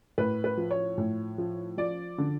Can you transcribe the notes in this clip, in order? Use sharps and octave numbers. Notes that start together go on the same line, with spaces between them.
A2 B4
B4
F3
C#5
A2
F3
F3 D5
D3